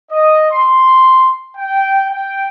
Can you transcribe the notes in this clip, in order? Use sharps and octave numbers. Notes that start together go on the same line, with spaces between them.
D#5
C6
G5
G5